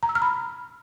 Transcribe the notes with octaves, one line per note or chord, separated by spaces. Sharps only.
A#5
E6
F6
B5